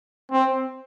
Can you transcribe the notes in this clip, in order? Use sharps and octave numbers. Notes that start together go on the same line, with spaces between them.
C4